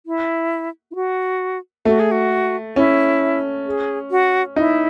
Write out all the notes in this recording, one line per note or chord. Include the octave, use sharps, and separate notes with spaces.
E4
E4
F#4
A3 F#4
G#4
F#4
C#4 E4
G#4
F#4
D#4 E4